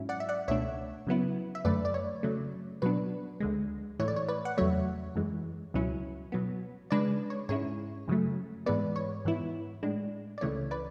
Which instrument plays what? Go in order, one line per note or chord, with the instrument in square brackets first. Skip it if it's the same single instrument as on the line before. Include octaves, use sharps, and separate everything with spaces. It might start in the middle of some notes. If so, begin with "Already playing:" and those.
Already playing: [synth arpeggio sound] G#2 F#3 C#4 E4
D5 F#5
E5
D5 F#5
C#2 B2 A3 D4 C#5 E5
C#3 F#3 B3 E4
E5
F#2 D3 A3 B4 D5
D5
C#5
C#3 F#3 A3
B2 F#3 B3 D4 B4
D2 D3 G#3
A2 E3 A3 C#5
D5
C#5
B4 D5
F#5
E2 C#3 F#3 A3 C#5 E5
F#2 E3 G#3
C#2 B2 F#3 C#4 E4
B2 F#3 B3
C#3 G#3 D4 B4 D5
C#5
G#2 G#3 C#4 E4 C#5
F#2 C#3 F#3 A3
G#2 E3 G#3 B3 B4 D5
C#5
G#2 E3 B3 E4
A2 G#3 D4
D5
C#2 C#3 E3 A3 C#5
B4 D5